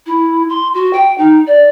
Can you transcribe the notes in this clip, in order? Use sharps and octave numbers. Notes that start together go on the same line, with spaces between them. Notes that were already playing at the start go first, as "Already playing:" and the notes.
E4
C6
F#4
G5
D#4
D5